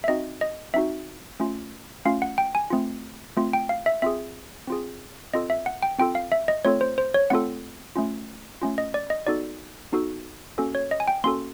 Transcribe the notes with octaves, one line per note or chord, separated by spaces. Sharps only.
E5
C4 D#4 F#4 D#5
D#5
C4 D#4 F#4 E5
A3 C#4 F4
A3 C#4 F4 F5
F#5
G5
G#5
A3 C4 F4
A3 C4 F4
G5
F5
E5
C4 F4 G#4 E5
C4 F4 G#4
C4 F4 A4 D#5
E5
F#5
G5
C4 F4 A4 G5
F5
E5
D#5
A3 C4 F4 A4 C#5
C5
C5
C#5
A3 C4 F4 A4 F#5
A3 C#4 F4
A3 C#4 F4
D#5
D5
D#5
B3 D#4 F#4 A4 D5
B3 D#4 F#4 A4
A#3 C#4 F#4 A4
C#5
D#5
G#5
G5
A#3 C#4 F#4 A4 C6